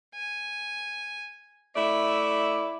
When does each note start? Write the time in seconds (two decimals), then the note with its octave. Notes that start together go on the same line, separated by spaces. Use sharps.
0.15 G#5
1.76 A3 E4 D5 E5